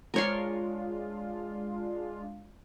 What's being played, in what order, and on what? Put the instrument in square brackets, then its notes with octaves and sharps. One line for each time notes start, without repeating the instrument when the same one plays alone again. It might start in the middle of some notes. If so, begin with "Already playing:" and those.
[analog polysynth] G#3 D4 F4 [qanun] A#4 C#5 C6